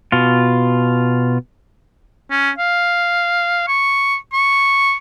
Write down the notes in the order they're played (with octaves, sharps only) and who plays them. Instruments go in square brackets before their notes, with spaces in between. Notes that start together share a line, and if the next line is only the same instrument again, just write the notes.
[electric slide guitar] B2 F4
[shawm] C#4
F5
C#6
C#6